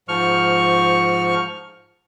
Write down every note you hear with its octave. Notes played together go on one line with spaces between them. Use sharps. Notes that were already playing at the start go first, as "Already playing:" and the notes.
G#2 F3 C#6 F6